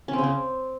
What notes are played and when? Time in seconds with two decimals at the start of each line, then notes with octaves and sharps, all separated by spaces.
0.08 C#4
0.13 C4
0.18 C#3
0.23 C4